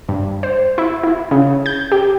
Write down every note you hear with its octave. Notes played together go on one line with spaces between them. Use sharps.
G2
C5
E4
E4
C#3
G6
G4